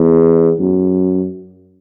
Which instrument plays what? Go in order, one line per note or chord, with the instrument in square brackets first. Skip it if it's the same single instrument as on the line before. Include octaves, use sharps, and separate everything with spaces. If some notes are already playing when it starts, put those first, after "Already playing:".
Already playing: [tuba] E2
F#2